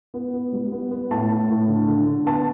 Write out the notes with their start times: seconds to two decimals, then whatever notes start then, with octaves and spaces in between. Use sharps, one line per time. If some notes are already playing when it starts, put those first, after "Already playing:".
0.14 B3
0.34 B3
0.53 G3
0.72 B3
0.91 B3
1.11 A2 A5
1.30 A2
1.49 A2
1.68 D3
1.88 D3
2.07 D3
2.26 B3 A5